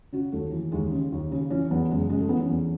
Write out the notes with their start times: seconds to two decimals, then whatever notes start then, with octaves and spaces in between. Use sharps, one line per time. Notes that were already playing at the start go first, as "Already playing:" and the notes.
0.13 C#3 F#4
0.32 D#2 A3
0.52 E3
0.72 D#2 G#3
0.91 C#3
1.12 D#2
1.32 C#3 C#4
1.50 E3 C#4
1.70 E2 B3
1.90 F#1 G#3
2.10 C#3 G#3
2.21 A3
2.29 E3 B3
2.40 C#4
2.49 E2